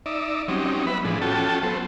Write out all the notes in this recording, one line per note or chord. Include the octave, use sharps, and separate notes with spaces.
D#4 D5 E5
F#3 G3 C4 C#4 D#4
B3 B4 E5 B5
A2 E3 F3 D4 G#4
C#4 F4 F#4 A4 G5 A5
F#3 B3 A4 C5